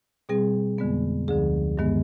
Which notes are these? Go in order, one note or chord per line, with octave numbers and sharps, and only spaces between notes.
B2 G3 C4 G#4
F2 D3 G#3 B3
D2 D3 F3 G#4
G2 D#3 G#3 B3